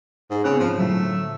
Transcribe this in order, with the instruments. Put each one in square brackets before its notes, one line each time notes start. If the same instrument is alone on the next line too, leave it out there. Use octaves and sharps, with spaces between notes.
[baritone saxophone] G#2
[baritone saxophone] C#3 [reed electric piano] B3 C4 F#6
[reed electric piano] G#2 C5 [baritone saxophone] F3
[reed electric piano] A2 D3 F#3 [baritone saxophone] A3